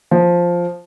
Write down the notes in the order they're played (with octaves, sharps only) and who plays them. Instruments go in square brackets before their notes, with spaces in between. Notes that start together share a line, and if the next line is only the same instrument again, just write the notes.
[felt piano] F3